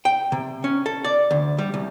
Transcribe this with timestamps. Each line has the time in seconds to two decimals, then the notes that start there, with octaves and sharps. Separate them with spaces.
0.05 G5
0.32 C3
0.64 C#4
0.86 A4
1.04 D5
1.31 D2
1.58 G3
1.74 C2